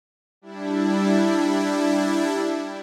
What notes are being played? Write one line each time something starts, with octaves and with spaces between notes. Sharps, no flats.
G3 D4 E4